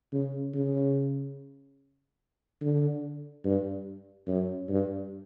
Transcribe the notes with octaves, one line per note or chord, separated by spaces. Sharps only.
C#3
C#3
D3
G2
F#2
G2